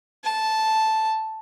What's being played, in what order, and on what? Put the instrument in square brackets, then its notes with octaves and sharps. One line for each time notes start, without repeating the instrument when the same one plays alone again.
[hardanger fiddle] A5